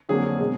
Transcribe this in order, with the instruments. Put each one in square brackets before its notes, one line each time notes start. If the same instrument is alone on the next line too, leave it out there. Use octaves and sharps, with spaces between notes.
[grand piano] F2 D3 F#3 A#3 G#4
B2 G#3